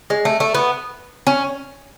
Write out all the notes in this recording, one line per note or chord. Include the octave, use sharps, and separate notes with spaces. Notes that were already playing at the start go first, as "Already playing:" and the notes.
G#3
A3
A3
B3
C#4